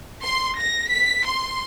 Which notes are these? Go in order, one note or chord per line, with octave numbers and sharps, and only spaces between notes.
C6
A#6
B6
C6